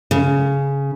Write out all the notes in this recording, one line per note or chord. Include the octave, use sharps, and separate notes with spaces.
C#3